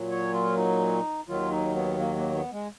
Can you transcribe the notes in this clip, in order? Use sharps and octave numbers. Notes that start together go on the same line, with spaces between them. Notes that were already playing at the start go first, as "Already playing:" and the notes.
Already playing: A#2 F#3
C#5
F4
D#4
D#2 D#3 F#3 F4
D#4
B3
A#3
A#3
B3
G#3